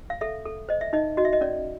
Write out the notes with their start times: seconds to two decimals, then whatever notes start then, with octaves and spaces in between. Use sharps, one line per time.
0.10 F5
0.21 A4 E5
0.46 A4
0.69 C5 D#5
0.81 E5
0.93 D#4 D#5
1.17 F#4 D#5
1.25 E5
1.33 D#5
1.41 C#4 D5